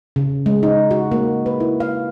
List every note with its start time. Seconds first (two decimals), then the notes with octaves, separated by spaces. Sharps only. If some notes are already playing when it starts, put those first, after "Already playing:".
0.16 C#3
0.46 G#3
0.63 D#4
0.91 F#4
1.12 A#3
1.46 B4
1.60 E4
1.80 F5